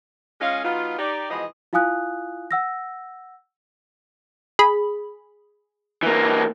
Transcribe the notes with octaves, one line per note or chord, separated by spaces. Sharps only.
G#3 C#4 F4 G#4 D#5 F5
F#3 B3 D#4 F4
D#4 G4 D5
B2 E3 F3 G#3 D#5
E4 F4 F5 G#5 D#6 F#6
F#5 E6 A#6
G#4 B5
E3 A#3